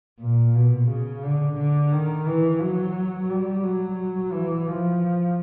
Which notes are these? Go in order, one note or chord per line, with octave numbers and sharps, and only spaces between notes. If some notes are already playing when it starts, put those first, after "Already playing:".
A#2
B2
C#3
D3
D3
D#3
E3
F#3
G3
F#3
E3
F3